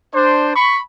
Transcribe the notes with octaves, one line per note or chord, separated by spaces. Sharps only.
D4 C5
B5 C#6